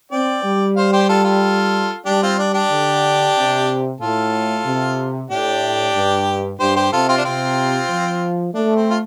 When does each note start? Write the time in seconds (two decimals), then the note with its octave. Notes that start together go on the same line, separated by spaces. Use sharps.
0.11 C4 D5 G5
0.44 G3
0.76 C5 F5
0.92 G4 C5
1.09 F4 A4
1.24 F4 A4
2.05 G3 D4 G4
2.22 C4 F4
2.39 D4
2.54 D4 G4
2.71 D3
3.36 C3
4.00 A2 F4 A4
4.65 C3
5.30 A2 D4 G4
5.95 G2
6.59 G2 G4 C5
6.76 G4 C5
6.91 C3 F4 A4
7.08 C4 F4
7.17 D4
7.24 C3 C4 F4
7.90 F3
8.54 A3 D4
8.75 C4
8.90 F4